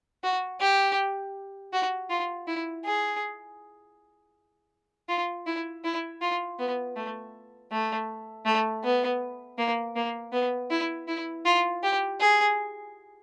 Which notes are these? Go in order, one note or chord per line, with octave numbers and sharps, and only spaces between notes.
F#4
G4
F#4
F4
E4
G#4
F4
E4
E4
F4
B3
A3
A3
A3
B3
A#3
A#3
B3
E4
E4
F4
G4
G#4